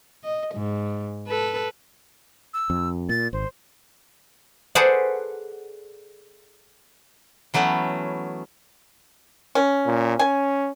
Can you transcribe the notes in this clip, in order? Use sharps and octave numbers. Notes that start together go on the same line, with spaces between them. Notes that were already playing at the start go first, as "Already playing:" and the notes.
D#5
G#2
A4 B4
E6
F2
A#2 A6
G#1 C5
G#4 A4 B4 C5 D5 F#5
E3 F#3 A3 B3 C#4
C#4
A#2
C#4 G#5